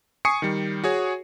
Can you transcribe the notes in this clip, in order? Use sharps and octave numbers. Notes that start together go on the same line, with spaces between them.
G#5 C#6 D#6 C7 C#7
D#3 G3
F#4 G#4 C#5